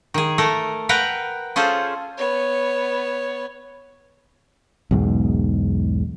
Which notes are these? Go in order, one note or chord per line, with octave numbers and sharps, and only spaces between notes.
D#3 G#4
A3 A4 A#4
A#4 B4 F#5 G5 A#5
C#4 F4 G#4 A4 C5
B3 C#5
B1 E2 G#2